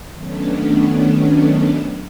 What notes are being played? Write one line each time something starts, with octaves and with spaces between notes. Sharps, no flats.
D#3 F#3 A3 B3 C#4 D4